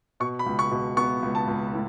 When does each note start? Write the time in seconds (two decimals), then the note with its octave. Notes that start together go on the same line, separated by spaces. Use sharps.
0.20 B2 C#6
0.39 B5
0.46 C#2
0.59 C#6
0.71 B2
0.97 B3 C#6
1.22 C#2
1.35 A5
1.47 C#2
1.73 A2